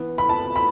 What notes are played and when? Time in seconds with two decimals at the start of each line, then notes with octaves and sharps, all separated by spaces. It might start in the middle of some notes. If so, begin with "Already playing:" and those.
Already playing: E3 B3
0.18 B5
0.29 A5
0.56 B5